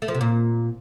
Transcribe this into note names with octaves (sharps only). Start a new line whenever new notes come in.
A3
F3
C3
A#2